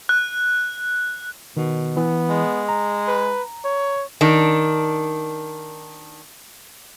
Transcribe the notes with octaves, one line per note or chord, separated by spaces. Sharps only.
F#6
B2 D#3
E3 B3
G#3
A#5
B4
C#5
D#3 D4